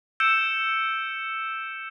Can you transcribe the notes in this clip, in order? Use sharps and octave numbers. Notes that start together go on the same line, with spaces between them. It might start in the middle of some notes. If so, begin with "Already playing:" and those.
E6 G6 C#7 D7 E7